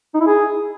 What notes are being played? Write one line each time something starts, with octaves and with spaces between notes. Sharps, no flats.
D#4
E4
G#4